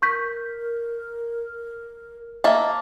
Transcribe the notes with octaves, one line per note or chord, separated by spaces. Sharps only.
A#4 C#6 G6 B6
A#3 D#5 E5 A5